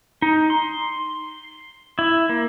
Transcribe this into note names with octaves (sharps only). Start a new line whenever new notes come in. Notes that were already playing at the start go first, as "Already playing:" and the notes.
D#4
C6
E4
A#3